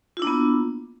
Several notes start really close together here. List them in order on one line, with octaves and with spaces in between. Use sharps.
F4 E4 D4 A#3 B3